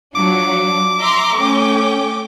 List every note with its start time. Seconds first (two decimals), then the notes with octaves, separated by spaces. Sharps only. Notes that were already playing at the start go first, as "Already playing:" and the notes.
0.15 F3 F#3 D4 D6
1.00 E5 A#5 C6
1.36 A3 C#4 G5